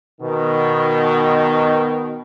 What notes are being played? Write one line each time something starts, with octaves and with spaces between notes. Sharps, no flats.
B2 D#3